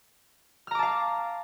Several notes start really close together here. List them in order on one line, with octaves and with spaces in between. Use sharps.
F6 A#5 D6 A5 F5